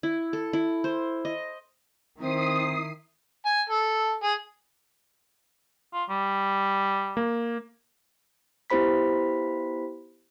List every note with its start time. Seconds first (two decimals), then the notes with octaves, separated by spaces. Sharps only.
0.03 E4
0.33 A4
0.53 E4
0.84 C5
1.25 D#5
2.20 D#3 C4 E4 D#6 C7
3.45 G#5
3.69 A4
4.23 G#4
5.93 F4
6.10 G3
7.17 A#3
8.70 B3 E4 G4 C5 B5 B6